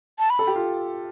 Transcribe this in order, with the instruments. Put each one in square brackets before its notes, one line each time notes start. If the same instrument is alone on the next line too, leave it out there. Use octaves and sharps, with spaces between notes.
[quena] A5
B5
[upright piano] A4
G4
F4